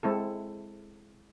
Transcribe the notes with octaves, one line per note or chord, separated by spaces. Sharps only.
G#3 C4 E4 A4